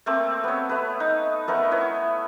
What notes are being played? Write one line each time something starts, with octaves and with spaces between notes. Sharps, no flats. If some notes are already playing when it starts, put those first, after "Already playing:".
A3 A#3 C4
B3 C#5
A3 B4
D#4
A3 B3 A#4 C#5
E4 B4 C#5